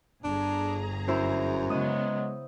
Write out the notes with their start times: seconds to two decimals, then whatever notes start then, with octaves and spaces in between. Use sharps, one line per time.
0.24 G1 D4 G#4 A#5
1.08 F#2 E4 C5
1.70 C#3 F#3 G#3 B3 D#6